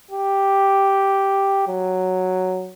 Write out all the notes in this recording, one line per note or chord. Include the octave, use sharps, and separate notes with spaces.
G4
F#3